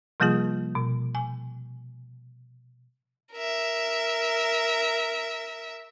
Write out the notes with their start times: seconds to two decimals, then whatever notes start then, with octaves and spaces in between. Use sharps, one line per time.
0.20 C3 F3 G3 A#3 F4 G#4
0.75 B2
1.15 G#5
3.33 A#4 E5